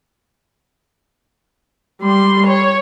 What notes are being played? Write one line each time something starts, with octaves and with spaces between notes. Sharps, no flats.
G3 C6
C#5